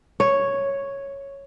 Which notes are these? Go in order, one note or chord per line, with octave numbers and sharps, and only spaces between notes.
C#5